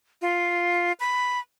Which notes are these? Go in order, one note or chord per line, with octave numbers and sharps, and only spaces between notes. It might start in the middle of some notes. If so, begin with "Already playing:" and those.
F4
B5